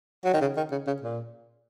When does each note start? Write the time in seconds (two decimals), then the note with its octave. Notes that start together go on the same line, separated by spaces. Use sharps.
0.25 F#3
0.34 D#3
0.42 C#3
0.57 D#3
0.72 C#3
0.87 C#3
1.02 A#2